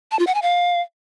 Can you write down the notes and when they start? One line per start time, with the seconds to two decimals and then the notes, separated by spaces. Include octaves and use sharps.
0.12 A5
0.19 F4
0.27 F#5
0.35 G#5
0.42 F5